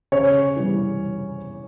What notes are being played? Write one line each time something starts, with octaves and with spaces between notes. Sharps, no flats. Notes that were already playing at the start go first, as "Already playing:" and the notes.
C#3 C#4 C#5
E3 G3 B3